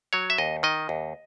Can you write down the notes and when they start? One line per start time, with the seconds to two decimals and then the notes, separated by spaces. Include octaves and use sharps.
0.13 F#3 C#5
0.30 E5
0.38 D#2 D#5
0.63 D#3 D#5
0.89 D#2